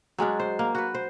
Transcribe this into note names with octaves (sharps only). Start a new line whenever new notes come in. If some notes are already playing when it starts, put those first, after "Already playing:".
F#3 G#3 C#4 D4
C5
A#3
F#4 B4
C5